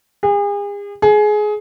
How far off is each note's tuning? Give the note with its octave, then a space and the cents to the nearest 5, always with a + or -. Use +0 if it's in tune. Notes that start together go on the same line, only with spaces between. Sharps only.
G#4 -40
G#4 +20